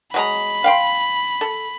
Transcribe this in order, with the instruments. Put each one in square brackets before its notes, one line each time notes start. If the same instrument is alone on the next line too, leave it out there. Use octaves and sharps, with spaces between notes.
[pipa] F#3 G#3 A#5 [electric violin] B5
[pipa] F5 G5 C6
A4